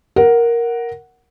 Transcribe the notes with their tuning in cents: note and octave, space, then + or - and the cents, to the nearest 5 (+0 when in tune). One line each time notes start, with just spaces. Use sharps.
A#4 +5 F#5 +0